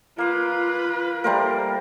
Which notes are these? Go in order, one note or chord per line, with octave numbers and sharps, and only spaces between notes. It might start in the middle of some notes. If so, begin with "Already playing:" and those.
A#3 F4 B4 F5
G3 A3 A#3 A#4 C5